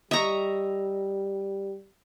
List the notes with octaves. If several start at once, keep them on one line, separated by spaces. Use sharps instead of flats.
G3 D#5 E5 A#5 C#6